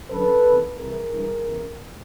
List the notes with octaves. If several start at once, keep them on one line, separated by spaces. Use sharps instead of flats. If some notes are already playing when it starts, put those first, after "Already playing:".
F#2 D3 A4 B4
E2 C3 D#3
C2 C3 E3 G#4 A#4
G2 E3
E2 C#3 E3